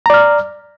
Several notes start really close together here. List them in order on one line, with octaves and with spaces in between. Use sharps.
A#5 D5 F6